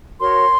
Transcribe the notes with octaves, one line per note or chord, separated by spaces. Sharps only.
F#4 A#4 C#5 C6